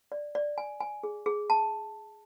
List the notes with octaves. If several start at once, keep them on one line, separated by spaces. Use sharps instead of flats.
D5
D5
G#5
G#5
G#4
G#4
A5